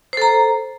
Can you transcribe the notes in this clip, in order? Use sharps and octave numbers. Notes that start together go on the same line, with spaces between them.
A4 C5 A#5